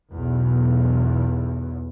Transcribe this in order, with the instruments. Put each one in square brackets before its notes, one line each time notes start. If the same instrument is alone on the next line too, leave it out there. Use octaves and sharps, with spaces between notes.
[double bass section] B1 E2